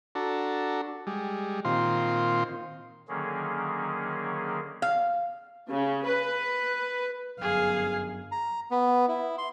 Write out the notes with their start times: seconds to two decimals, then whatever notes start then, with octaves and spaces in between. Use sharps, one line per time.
0.15 D4 F#4 A4 A#5
1.07 G3 G#3
1.65 A#2 D#3 C4 F4 C6
3.08 D3 D#3 F#3 A#3 C#4 G#4
4.82 F5
5.69 C#3
6.05 B4
7.41 G1 F#2 G#4 F5
8.32 A#5
8.71 B3
9.08 E4
9.38 C6